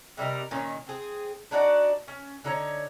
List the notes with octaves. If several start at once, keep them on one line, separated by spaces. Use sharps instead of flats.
C3 G3 D#4 A#4
A#2 D#3 C#4
C4 G#4
D4 D#4 F#4 D5
C#4
D3 D#4 C#5